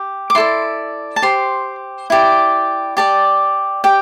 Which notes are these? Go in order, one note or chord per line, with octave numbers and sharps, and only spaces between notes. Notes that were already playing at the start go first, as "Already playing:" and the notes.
Already playing: G4
D6
E4 A4 D5 C6
A5
G4 C5 C6
E4 G4 D5
G4 D5 A5
G4 G5